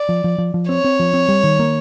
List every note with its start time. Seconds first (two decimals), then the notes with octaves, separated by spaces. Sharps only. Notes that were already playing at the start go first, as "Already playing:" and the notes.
Already playing: D5
0.09 F3
0.24 F3
0.38 F3
0.54 F3
0.69 C4 C#5
0.84 C4
1.00 F3
1.14 C4
1.29 G3
1.44 D#3
1.59 A#3